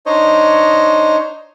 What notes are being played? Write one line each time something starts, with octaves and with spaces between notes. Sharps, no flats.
D4 D#4 C5 C#5 D#5